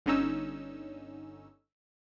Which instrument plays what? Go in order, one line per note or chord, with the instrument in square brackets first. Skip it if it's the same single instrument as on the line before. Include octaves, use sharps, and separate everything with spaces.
[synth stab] G1 D3 C#4 D#4 E6